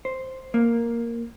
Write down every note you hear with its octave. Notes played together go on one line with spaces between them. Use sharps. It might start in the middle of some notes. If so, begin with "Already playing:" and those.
C5
A#3